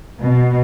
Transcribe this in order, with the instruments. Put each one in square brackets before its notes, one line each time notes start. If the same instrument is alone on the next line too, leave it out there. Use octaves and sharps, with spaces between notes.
[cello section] B2